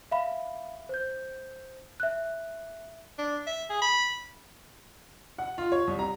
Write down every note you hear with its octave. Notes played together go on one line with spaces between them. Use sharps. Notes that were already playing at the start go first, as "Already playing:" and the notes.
E5 F5 B5
C5 G6
E5 F#6
D4
E5
G#4
B5
F#5
F4
C#5
C2
A#5